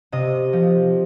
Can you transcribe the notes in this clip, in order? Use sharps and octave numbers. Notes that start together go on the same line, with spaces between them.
C3 D#5
F3